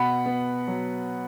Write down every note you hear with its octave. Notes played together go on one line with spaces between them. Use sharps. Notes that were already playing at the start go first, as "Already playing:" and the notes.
Already playing: B2 F#5 B5
B3
F#3